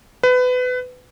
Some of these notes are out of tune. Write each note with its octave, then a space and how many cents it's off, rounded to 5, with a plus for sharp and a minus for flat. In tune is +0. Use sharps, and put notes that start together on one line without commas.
B4 +25